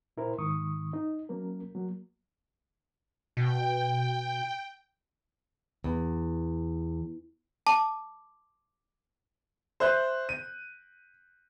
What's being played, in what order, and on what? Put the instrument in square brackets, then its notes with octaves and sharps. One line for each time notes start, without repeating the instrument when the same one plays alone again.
[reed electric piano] A#2 E4 A#4 C5
G#2 D#3 C#6 D#6
D#4 D#5
F#3 A#3 C#4 A#4
F#3 A#3
[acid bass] B2 [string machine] G5
[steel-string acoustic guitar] E2
[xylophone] A5 [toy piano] D6
[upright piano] C5 E5 F#6 G6
D#7